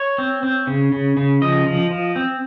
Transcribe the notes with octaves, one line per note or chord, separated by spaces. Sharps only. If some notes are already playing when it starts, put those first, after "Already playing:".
Already playing: C#5
C4
C4
C#3
C#3
C#3
F3 D#5
F3
F3
C4